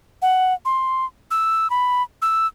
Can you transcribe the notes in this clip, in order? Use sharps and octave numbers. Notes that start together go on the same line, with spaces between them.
F#5
C6
E6
B5
E6